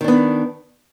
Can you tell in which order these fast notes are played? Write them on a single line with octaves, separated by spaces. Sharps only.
D#3 D4 B3